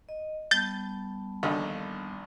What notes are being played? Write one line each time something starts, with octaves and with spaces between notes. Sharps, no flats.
D#5
G3 B3 A5 G6 A6
A#1 D#2 D3